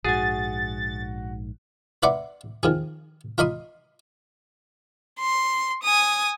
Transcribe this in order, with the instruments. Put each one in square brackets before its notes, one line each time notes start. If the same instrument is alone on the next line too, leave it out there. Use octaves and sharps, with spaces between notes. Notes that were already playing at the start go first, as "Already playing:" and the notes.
[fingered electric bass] A#1 G#2 [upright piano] F#4 [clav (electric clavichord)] G#4 G#5 [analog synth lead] A6
[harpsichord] B4 D5 E5 F#5 C6 D6
D#3 F3 G#4
F4 A#4 D#5 B5 C6 D#6
[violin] C6
G#5 D#6